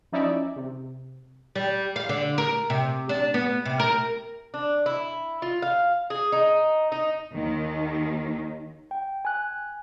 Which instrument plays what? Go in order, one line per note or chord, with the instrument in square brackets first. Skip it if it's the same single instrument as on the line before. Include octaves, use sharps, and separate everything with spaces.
[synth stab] F3 C#4 D#4 E4 D5 E5
C3
[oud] G3
F5
D3
A#4
C3
D4
B3
C3
A#4
[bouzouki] D4
E4
F4
F5
G#4
D#4
D#4
[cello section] D#2 D#3
[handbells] G5
G#5 F#6